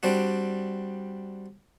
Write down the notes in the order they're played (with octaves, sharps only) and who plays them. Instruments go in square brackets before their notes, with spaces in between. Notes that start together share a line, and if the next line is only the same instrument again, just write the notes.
[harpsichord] G3 C4 D4 F#4